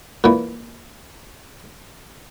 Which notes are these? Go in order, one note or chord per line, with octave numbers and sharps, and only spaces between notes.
A#2 E3